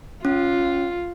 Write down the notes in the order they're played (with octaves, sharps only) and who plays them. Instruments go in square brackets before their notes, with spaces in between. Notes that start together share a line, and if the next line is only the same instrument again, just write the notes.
[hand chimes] C#4 [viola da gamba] F4